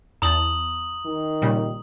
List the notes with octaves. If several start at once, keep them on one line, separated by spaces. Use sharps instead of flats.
E2 A5 A#5 D#6 F#7
D#3
A#2 C#3 G3